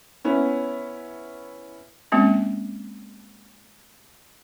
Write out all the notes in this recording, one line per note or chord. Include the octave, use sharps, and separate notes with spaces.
B3 C#4 E4
G#3 A#3 C4 C#4